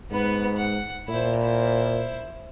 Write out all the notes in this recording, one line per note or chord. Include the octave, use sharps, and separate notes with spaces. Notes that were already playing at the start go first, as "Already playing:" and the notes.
G#2 B3 B4
F#5
A#2 E4 C5
E4 C5